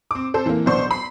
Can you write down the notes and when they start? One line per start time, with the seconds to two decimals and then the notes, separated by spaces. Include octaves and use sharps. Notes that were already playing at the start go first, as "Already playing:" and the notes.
0.11 C4 D6
0.34 C4 A4 C5
0.46 E3 A#3
0.66 B1 B3 D4 C5 C6 C#6
0.91 B5 C7